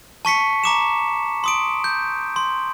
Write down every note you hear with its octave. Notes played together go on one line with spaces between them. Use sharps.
A5 C#6 B6 C#7
A#5 D6 E7
C6 D#6 D7
G6
C6